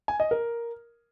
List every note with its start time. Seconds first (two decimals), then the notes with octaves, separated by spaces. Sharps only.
0.08 G#5
0.20 D#5
0.31 A#4